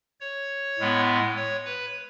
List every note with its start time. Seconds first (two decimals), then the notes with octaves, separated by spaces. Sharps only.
0.20 C#5
0.79 A2 G#3 B3
1.36 C#5
1.65 B4